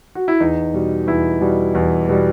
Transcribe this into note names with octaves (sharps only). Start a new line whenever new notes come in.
F#4
E4
E2 D#4
B2 G3
E2 E4
B2 G3
E2
B2 G3